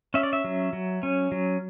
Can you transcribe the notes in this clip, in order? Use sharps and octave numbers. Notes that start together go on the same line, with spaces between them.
C#4 E5
D5
E5
F#3
F#3
C#4
F#3